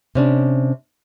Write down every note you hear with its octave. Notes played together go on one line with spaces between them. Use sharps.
C3 C#4 D4